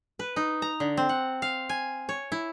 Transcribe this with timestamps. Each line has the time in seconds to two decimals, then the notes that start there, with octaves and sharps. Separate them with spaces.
0.19 B4
0.36 D#4
0.62 A#5
0.80 D3
0.97 C4
1.09 F#5
1.42 F5
1.69 G#5
2.09 C#5
2.32 E4